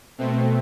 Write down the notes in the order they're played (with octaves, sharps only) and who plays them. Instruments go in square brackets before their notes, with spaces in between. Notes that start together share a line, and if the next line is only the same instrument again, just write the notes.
[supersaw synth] B2 A3 C4